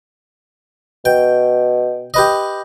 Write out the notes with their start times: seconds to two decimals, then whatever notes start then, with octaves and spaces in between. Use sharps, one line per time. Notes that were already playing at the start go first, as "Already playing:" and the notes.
1.05 B2 G5
2.14 G4 B4 D#5